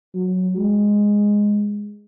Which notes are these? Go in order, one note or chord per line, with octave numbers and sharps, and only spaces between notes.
F#3
G#3